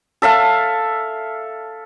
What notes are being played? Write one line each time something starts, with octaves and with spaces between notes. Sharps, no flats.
A4 E5 F5 A5